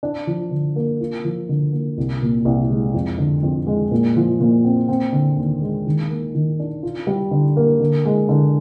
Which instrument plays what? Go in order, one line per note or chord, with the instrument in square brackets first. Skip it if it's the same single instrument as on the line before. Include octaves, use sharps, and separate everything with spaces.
[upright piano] D4
F3
D3
A#3
F4
F3
D3
A#3
C2
A#2
C2
G#3
F2
D3
F2
G#3
A#2
F3
A#2
C4
C4
D3
D#2
G#3
D#3
A#3
D#3
D4
F4
G3
D3
A#3
D3
G#3
D3